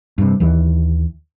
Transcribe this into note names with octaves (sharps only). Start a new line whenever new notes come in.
G2 C3
D#2 E3